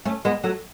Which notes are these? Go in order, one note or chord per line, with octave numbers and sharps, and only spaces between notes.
A3 C#4
G#3 B3
F#3 A3